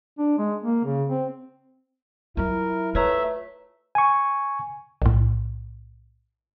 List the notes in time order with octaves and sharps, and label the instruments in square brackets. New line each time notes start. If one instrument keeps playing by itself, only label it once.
[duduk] D4
G#3
A#3
C#3
C4
[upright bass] F#3 F4 [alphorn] E4 [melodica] A#4
[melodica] A3 E5 [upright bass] F4 [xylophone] B4 C#5 A#5
[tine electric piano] G#5 C#6
[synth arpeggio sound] B1 A2